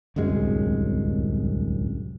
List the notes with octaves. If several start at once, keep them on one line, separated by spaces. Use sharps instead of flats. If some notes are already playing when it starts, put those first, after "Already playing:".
D1 C2 F#2 G#3